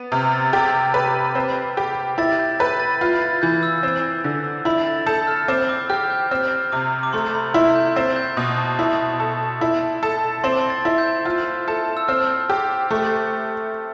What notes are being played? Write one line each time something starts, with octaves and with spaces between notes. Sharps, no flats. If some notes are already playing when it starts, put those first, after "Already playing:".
Already playing: B3
C3 F6
A6
G4 A6
B4
C4
G4
E4 A6
G6
B4 G6
A6
F4
A6
E3 G6
E6
C4
D3
E4 B5
A6
A4 G6
F6
C4 D6
D6
G4 F6
G6
C4 F6
C3 D6
D6
A3 C6
B5
E4 C6
G6
C4 A6
G6
B2 B5
A5
E4 B5
A4
E4
A4
C4 C6
D6
C6
A6
E4
G6
F4
A4
E6
C4 F6
G4
A3